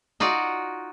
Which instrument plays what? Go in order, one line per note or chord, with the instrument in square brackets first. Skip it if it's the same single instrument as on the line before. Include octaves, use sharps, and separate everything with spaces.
[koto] D#4 F4 F#4 D5